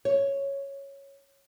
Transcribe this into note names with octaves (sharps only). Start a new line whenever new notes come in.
C#5